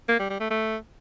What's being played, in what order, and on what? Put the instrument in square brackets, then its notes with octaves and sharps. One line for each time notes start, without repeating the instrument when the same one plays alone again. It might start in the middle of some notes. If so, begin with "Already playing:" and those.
[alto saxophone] A#3
G3
G3
A3
A3